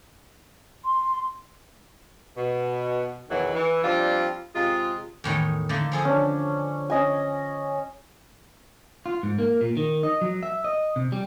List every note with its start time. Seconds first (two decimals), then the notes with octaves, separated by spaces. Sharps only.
0.85 C6
2.37 B2
3.30 E2 B2 D#3 E3 F#3
3.55 E3
3.84 F3 G3 C4 D4 F4
4.56 C3 G#3 F4
5.24 E2 A2 D#3
5.69 D3 A3 A#3
5.92 F3 G#4 A4
6.05 C#4 D4
6.90 C#4 D#5 G#5
9.06 F4
9.23 G#2
9.39 A#3
9.61 A#2
9.77 D#3
10.03 D#5
10.21 F#3
10.43 E5
10.64 D#5
10.96 C3
11.12 G3